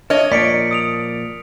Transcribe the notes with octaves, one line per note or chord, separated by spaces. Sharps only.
D4 C#5 D#5 F6
A#2 F3 A#3 D5 B6 C#7 D7
D#6 D7 F7